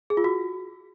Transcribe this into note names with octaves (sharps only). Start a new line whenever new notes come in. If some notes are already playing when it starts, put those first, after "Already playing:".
G#4
F4
F#4